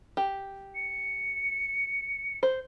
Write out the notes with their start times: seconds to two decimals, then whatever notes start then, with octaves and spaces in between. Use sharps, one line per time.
0.17 G4
0.75 C#7
2.43 C5